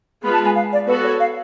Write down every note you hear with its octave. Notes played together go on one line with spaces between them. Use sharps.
G#3 B3 F4 B4 B5
A5
G#5
F5
D5
B3 F#4 A4 B4
C#5
F5